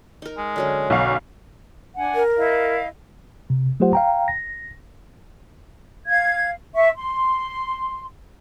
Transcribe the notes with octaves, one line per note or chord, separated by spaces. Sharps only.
D#4 A#4
G#3
D3 F#3 C#4
B1 F#4 F5
D4 F#5 G#5
A#4
E4 D#5 F5
C3
F#3 A3 F4 G4 C5 F#5
F5 G5 A#5
A#6
F5 G#6
E5 C#6
C6